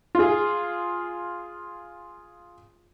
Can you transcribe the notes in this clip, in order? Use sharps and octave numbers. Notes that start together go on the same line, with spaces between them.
F4 G#4